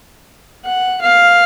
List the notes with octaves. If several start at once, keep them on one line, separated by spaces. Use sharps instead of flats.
F#5
F5